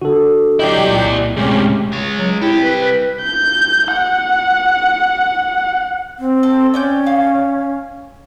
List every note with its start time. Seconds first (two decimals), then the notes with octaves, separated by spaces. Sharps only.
0.02 D3 F#4 A4
0.59 F#3 E4 G4 D5 D#5 G6
0.74 E1
0.87 C2 A#2
1.36 D2 A2 C3 G#3 C#4 G4
1.92 G#3 C#5
2.17 F#3
2.41 C2 E4 G4
2.62 B4
2.82 B4
3.25 G6
3.93 F#5
6.19 C4
6.43 A4
6.74 C#4 D5 G5 G6
7.06 F5